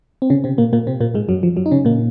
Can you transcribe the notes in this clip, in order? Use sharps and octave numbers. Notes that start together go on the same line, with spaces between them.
C4
C#3 C#4
C3 C4
A#2 A#3
A#2 A#3
C3 C4
A#2 A#3
G#2 G#3
F#2 F#3
F3
F#2 F#3
D#4
C#3 C#4
A#2 A#3